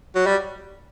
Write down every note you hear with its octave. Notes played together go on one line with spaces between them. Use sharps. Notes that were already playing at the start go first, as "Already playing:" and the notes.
F#3
G3